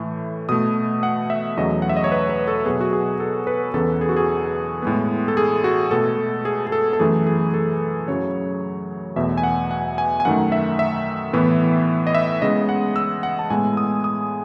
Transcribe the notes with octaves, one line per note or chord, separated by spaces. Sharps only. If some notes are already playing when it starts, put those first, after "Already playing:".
Already playing: A2 E3 A3
B2 A3 D#6
F#5
E5
E2 C#3 F#3 A3 D#5
F#5
E5
D#5
C#5
B4
B4
A4
B2 F#3 B3 G#4
F#4
G#4
A4
B4
E2 C#3 E3 B3 A4
G#4
F#4
G#4
A2 G#3 B3
A4
G#4
F#4
B2 A3 A4
G#4
G#4
A4
A4
F#2 E3 A3 G#4
G#4
A4
F#2 C#3 F#3 C#5
E2 B2 A3 E5
G#5
F#5
F#5
G#5
G#5
F#2 D#3 A3 F#5
E5
E5
A2 E3 B3
D#5
E5
C#3 G#3 B3 D#5
F#5
E6
F#5
A5
A2 G#3 B3 G#5
D#6
D#6